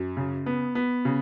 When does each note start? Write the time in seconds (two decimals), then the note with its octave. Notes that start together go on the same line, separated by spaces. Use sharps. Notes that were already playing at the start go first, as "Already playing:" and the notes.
Already playing: F#2
0.17 C#3
0.46 B3
0.75 B3
1.05 C#3